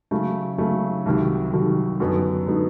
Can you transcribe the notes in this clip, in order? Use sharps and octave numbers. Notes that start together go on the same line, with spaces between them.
C#3 F#3 A3
C#3 F#3 A3
C2 C3 D#3 F#3
C2 C3 D#3 F#3
F#2 D3 F#3 B3 D#4
D3 F#3 B3 D#4